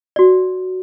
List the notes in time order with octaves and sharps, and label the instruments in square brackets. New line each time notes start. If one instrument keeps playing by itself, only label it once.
[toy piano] F#4 D5